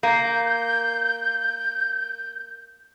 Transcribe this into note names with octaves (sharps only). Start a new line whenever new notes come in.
A#3 G6